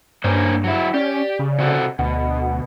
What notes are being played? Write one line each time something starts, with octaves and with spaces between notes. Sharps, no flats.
G2 A#3 C#4 C5
F#3 E4
C#4 G4 D5
C#3
C3 F#4 A4
D2 B2 F#5